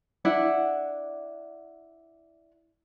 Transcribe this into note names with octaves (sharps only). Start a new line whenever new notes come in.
D4 E4 F#5